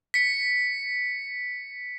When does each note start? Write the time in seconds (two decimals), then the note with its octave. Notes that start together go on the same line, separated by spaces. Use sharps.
0.14 B6 C#7